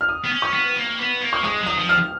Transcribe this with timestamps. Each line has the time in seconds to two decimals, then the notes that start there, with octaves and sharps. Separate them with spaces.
0.01 F6
0.09 D#6
0.24 B3
0.32 C#4
0.42 C#6
0.54 B3
0.76 A#3
0.99 B3
1.21 A#3
1.33 C#6
1.44 G#3 D#6
1.61 F#3
1.66 D#6
1.78 F3
1.89 F6